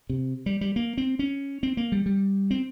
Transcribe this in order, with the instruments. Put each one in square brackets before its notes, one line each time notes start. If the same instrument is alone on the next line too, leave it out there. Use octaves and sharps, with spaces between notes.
[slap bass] C3
G3
G3
A#3
C4
C#4
C4
A#3
G3
G3
C4